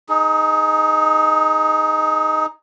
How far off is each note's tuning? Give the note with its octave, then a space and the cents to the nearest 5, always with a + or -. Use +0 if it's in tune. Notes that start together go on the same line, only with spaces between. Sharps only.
D#4 +0 G#4 +25